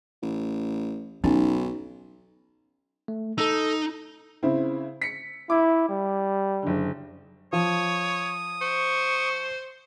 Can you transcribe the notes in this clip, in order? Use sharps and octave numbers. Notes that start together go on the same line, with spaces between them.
A1
B1 C#4 D#4
A3
D#4 A4 E6
C#3 C4 E4
B6 C#7
E4 D6
G3
F#1 D3
F3 C#5 D#6
C5 C#6